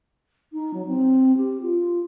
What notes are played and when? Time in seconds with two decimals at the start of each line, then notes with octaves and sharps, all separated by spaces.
0.53 D#4
0.74 F#3
0.87 C4
1.37 G4
1.62 F4